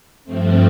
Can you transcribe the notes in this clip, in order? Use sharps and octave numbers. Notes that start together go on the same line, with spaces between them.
G2 F3 A3 C4